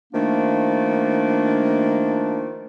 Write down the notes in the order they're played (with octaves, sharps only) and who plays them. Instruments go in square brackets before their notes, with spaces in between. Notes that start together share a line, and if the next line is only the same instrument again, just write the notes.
[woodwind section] D#3 F3 A3 A#3 D4